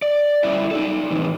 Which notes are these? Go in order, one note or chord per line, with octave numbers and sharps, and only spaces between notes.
D5
G3 C#4 E4 E5
D#4 A4
A2 C3 E3